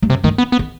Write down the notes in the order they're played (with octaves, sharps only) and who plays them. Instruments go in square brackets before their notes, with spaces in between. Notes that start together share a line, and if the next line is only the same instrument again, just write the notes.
[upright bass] G2
[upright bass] F#2 [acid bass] C3
[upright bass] G2 [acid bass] D#3
[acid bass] B3
B3
[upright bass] D#3